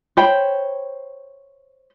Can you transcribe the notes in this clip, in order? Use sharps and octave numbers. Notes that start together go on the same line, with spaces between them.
C5 C#5 G5 B5